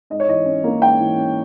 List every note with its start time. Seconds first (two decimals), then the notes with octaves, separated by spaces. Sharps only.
0.10 G#2 D#5
0.20 C#5
0.28 E3 D#5
0.45 C#4
0.64 A#3
0.81 G#2 G5
1.00 E3
1.16 C#4